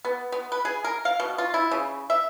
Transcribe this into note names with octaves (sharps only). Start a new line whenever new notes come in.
B3
B3
B4
G#4
A#4
F5
B2
F4
E4
C#3
E5